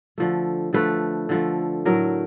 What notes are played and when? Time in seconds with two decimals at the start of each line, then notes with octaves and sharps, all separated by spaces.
0.18 D3 F3 A3
0.73 D3 F3 A3 B4
1.29 D3 F3 A3
1.85 A2 F#3 A3 A#4